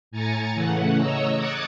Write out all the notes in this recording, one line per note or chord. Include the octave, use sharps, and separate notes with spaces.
A2 G#5 A#5 A6 C#7
C#3 E3 A3 F#5
C#5 D#5 A#5 E6
D6 D#6 F#6 G#6 A6 C#7